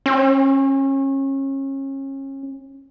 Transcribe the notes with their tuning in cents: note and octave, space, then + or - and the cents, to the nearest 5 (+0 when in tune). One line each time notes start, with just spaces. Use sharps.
C#4 -30